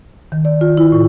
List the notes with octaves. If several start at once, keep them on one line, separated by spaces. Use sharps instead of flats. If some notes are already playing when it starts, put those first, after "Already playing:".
D#3
D5
F4
E4
A2